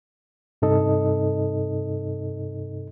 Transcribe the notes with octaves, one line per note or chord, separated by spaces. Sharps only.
G2 C3 D#4 A4 D#5